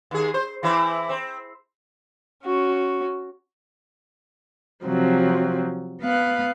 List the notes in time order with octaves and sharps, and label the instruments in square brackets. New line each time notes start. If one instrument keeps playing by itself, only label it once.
[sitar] D#2 G#4
C5
E3 C4 E4
C4
[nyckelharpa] C#4 F#4
[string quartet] C3 F3 F#3 C4
B3 F5 F#6